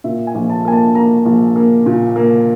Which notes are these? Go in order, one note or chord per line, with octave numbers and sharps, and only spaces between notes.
A#2 E5
G#5
A#1
A5
A#3 G#5
A5
A#3 A#5
A#1
A#3
A#2
A#3